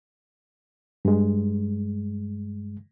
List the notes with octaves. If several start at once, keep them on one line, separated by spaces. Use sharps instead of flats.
G2 G#3